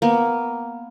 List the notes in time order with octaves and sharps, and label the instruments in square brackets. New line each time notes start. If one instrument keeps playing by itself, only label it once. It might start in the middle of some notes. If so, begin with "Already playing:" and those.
[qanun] A#3 B3